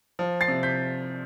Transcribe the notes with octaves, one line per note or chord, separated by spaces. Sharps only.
F3
A6 C7
C3
G6 B6